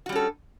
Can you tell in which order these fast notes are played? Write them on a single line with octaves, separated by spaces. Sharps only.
F#4 G3 C#4 A4